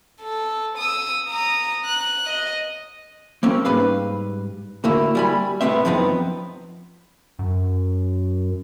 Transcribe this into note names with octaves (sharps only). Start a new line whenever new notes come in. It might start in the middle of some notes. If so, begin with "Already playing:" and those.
A4
D#6 E6
A#5 D#6
F#6
D#5
A#3 C4 C#4
G#2 G3 B4 F5
D2 A2 A#3 E4
G3 G#5 B5
C2 A2 B3 C4 E5
F#2 F3 B3 C4 D#4
F#2